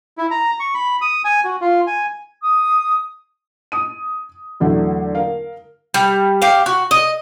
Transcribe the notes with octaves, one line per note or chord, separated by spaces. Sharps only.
E4
A#5
C#6
B5
D#6
G#5
F#4
F4
G#5
D#6
D#6 D#7
E2 D3 F#3 A3
A#4 F5
G3
G4 F5
F#4
D#5